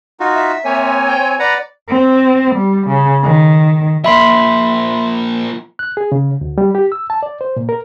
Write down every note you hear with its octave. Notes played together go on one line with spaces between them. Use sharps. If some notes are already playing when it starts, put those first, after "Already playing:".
D#4 F4 F#4
E5
A#3 C4 C#5 G#5
G5
B4 D5 F#5 A#5
C4
G3
C#3
D#3
F3 A#3 E5 B5 C6
F#6
G#4
C#3
D2
G3
G4
E6
A5
D5
C5
A#2
A#4